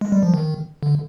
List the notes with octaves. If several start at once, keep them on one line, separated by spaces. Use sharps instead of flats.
G#3
G3
F3
D#3
D3